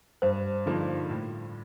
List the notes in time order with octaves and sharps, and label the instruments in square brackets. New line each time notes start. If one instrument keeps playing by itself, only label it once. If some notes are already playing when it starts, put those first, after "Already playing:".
[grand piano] G2 [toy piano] C5
[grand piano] D3 F3 A#3 D#4
A2